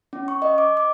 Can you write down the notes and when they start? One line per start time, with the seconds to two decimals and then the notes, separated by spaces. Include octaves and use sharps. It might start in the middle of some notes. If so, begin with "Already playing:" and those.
0.13 C#4
0.28 C#6
0.42 D#5
0.58 D6
0.77 D6